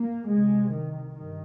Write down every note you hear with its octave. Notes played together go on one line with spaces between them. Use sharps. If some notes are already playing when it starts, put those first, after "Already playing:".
Already playing: A#3
C2 C3 G#3
D#3
G2 D#3